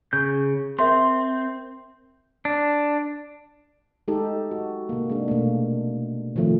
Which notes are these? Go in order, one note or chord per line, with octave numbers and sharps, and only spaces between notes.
C#3 G6
C4 A#4 E5 C6
D4
G#3 D#4 G4 A4
F#4
C3 A#3
G#3 D4
B2 A3 A#3
C3 D#3 F3 A3 C4